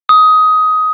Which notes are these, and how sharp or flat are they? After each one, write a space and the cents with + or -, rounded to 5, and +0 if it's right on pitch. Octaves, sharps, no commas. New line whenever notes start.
D#6 +15